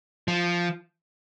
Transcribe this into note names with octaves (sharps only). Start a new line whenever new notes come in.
F3